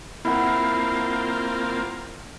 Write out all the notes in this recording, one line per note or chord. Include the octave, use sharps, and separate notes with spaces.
A#3 C4 E4 F4 F#5